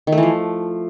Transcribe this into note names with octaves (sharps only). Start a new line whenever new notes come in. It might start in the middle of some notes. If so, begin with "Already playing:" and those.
D#3
A3
E3
F3